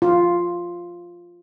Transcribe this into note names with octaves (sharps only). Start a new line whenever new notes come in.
F4